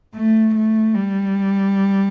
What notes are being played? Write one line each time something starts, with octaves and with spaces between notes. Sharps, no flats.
A3
A3
G3